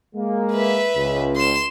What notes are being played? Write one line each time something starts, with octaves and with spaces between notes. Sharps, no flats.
G#3 A#3
B4 E5
C#2
C6 E7